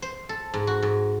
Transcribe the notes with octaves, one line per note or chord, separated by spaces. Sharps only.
C5
A4
G#2
F#4
G#2